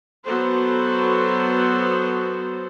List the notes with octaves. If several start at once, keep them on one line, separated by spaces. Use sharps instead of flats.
F#3 B3 F#4 A4 C5